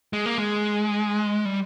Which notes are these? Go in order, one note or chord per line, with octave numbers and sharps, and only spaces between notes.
G#3
A#3
G#3
G3